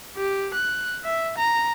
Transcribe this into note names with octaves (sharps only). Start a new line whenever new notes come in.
G4
F#6
E5
A#5